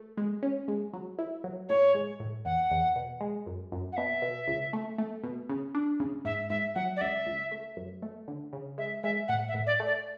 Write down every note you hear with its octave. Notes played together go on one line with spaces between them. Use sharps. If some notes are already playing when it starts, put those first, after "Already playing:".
Already playing: A3
G#3
C#4
G#3
F#3
E4
F#3
A2 C#5
G#3
A2
E2 F#5
E2
B2
G#3
F#2
F#2
F#5
B2 E5
B2
C#2
A3
A3
B2
C#3
D4
C#3
G#2 E5
G#2 E5
F#3 F#5
D5
C#2 E5
C#2
A3
F#2
A3
D3
C#3
G#3 E5
G#3 E5
A2 F#5
E5
A2
D5
A3
D5